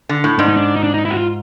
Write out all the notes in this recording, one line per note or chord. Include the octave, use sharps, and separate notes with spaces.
D3
A2
G#2 D4
D#4
D4
D#4
D4
D#4
E4
F#4
F4